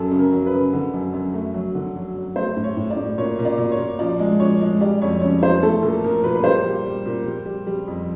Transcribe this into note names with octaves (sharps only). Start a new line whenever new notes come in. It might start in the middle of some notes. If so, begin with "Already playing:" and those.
Already playing: F#2 F#3 A4
C#3
A#4
F#3
B4
C#3
D3
F#2
F#2
A3
F#3
D3
F#3
F#3
A3 C5
A2
C#5
A2
D5
A2
A#2 C#5
A#2
D5
A#2
C#5
A#2
F3 D5
G#3
F3 C#5
G#3
G3 D5
F2 C#5
C#3 C#5
E3 C5
A3 A4
A#2 A4
F3 A#4
A#2 B4
B4
G3 C5
G3
G3
A#2
G3
G3
G3
F2